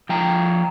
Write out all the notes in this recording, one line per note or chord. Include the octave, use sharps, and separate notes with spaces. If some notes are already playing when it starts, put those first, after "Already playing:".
F3 G5 A#5